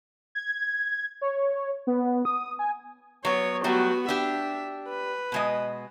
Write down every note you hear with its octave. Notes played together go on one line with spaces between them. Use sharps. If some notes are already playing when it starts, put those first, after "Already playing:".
G#6
C#5
B3
D#6
G#5
F#3 B3 C#5
F#3 G3 A3 B3 F#4
D4 G4 E5
B4
B2 G#3 D#5